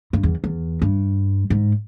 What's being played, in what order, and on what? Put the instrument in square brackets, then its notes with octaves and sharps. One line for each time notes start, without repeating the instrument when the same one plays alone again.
[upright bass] G2
E2
E2
G2
G#2